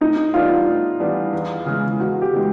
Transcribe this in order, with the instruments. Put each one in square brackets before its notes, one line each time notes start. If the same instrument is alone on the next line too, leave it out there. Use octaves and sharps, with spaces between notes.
[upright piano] A2 [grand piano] D#4
[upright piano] E3 G3 B3 D4 [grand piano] F4
[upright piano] A2
E3 G3 B3 D4
E2
C#3 E3 G#3
[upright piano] E2 [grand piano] F#4
[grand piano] G4
[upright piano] C#3 E3 G#3